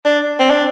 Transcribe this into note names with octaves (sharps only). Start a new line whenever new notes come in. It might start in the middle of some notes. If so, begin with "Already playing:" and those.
D4
C4
D4